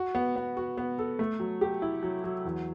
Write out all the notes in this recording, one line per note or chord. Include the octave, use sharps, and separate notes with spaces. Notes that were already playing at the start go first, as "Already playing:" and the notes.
Already playing: F#4
B3
B3
F#4
B3
A4
A3
F#3
G4
E4
F#3
F#3
E2